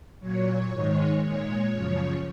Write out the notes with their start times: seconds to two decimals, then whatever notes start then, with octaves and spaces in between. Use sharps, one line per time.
0.20 A#2 F#3 C#5
0.71 G#2 D#3 G#3
1.22 A#2 G#3 C#5
1.73 F#2 C#3 F3